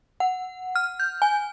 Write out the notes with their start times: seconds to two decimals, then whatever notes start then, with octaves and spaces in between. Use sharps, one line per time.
0.20 F#5
0.75 F6
1.00 G6
1.22 G#5